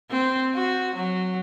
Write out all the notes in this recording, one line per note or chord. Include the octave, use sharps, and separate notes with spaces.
C4
F#4
F#3